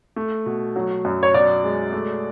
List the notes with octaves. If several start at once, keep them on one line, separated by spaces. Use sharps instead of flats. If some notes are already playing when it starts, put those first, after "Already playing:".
A3
B2
F#3
F#2
C#5
B2 D5
G#3
A3